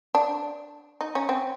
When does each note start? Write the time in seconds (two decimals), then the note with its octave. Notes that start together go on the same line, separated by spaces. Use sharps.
0.15 D4
1.01 D#4
1.15 C#4
1.29 C4